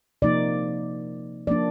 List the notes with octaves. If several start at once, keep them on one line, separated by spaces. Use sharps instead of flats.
C3 F3 A#3 D#4 D5
F3 A#3 D4 D5